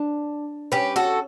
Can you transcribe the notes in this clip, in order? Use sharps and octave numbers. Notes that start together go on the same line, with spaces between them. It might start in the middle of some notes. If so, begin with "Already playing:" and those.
Already playing: D4
C#4 G4 B4
F#4 A4